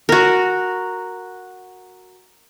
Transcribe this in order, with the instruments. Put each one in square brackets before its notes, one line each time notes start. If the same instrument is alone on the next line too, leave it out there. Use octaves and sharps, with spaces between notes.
[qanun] F#4 A#4